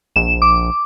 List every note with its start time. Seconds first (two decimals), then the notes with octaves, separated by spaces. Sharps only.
0.16 A#1 E7
0.42 D6